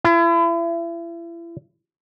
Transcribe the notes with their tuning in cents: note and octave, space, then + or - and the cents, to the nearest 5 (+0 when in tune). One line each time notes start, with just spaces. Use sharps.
E4 +35